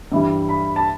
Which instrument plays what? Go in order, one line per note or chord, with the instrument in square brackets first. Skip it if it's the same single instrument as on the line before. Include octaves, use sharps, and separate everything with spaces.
[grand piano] G2 E3 G3
B5
A5